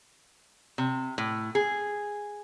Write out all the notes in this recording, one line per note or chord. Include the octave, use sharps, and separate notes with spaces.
C3
A2
G#4